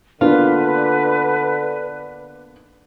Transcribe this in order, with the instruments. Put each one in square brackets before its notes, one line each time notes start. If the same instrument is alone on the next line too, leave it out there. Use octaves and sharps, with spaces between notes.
[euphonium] D3 [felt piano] A#3 B3 D4 [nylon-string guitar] F4 [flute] B4